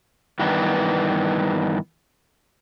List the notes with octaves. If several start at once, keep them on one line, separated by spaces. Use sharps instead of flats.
G2 D#3 E3 B3